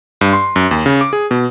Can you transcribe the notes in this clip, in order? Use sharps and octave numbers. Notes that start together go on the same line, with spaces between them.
G2
C6
F#2
D#2
C#3
D6
G#4
B2